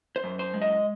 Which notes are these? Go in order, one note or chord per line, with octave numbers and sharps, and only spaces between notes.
C5
F#2
C5
G#3
D#5